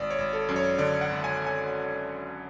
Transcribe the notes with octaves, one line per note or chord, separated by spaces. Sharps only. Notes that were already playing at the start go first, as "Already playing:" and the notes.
Already playing: G#1 D5
C#5
G#1
A4
F#2
C#5
D3 D5
F#5
G#1
G#5
G#5